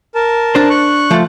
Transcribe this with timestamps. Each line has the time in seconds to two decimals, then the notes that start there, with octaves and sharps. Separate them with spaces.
0.15 A#4 A5
0.55 D4 C5
0.70 C#6 F#6
1.11 F3 A3